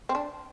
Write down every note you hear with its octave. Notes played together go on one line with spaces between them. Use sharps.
C4
D4